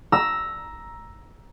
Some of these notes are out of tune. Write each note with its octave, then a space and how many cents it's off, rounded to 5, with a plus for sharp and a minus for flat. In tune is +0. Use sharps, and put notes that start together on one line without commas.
A#5 +10 E6 +0